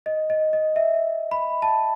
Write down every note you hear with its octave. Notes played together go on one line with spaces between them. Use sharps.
D#5
D#5
D#5
E5
B5
A5